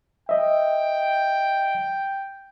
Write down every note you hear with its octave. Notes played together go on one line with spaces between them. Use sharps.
D#5 E5 G5